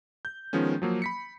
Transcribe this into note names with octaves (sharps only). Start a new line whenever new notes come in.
G6
D#3 F3 G#3 B3 C#4
F3 F#3 A#3
B5 B6 C#7